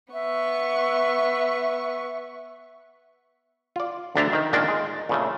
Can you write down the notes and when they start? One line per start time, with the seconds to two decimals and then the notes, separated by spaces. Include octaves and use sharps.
0.13 B3 E5 C#6
3.76 F4 D5
4.16 D2 D3 D4 E5 A5 A#5
4.33 D#3 D#4
4.53 A#2 D#3 G#3 D4 A#4 D5
4.68 G#3
5.09 A#2 C#3 A3